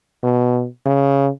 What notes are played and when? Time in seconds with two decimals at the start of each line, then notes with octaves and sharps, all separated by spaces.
0.23 B2
0.86 C#3